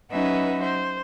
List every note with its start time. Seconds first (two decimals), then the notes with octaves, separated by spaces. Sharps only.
0.11 F#3 C#4 D#4 B4 E5 F#5
0.63 C5